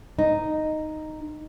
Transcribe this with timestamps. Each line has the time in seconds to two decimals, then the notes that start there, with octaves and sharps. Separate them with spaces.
0.19 D#4